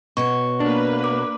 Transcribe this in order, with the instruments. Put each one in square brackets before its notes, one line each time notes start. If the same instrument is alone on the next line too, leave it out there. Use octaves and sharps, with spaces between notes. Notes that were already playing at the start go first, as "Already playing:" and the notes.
[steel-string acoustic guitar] B2 F#4 C#5 [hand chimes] C#6
[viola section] A#3 B4 [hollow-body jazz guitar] D4
[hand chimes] D6